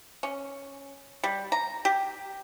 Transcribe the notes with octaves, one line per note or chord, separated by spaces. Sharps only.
C#4
G3
A#5
G4